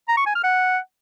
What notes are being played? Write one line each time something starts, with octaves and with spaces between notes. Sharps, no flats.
A#5
C#6
G#5
F6
F#5